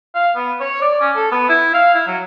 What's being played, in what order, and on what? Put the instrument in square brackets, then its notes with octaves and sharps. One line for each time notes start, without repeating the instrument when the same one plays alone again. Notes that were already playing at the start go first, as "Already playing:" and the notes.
[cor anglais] F5
B3
C#5
D5
C#4
A4
B3
E4
F5
E4
F#3